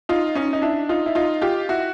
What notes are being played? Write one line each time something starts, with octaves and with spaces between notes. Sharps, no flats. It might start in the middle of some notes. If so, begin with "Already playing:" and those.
D#4 F4
C#4 D#4
D#4
D4 E4
D#4 F4
E4
D#4 F4
F4 G4
E4 F#4